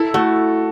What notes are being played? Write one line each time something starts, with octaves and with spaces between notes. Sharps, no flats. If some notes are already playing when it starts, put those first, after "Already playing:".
Already playing: E4 A4
A3 F#4